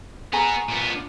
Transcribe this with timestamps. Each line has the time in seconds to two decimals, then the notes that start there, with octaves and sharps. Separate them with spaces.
0.33 B3 F#4 G#4 G#5 A#5
0.69 A#2 B3
0.92 D4 F4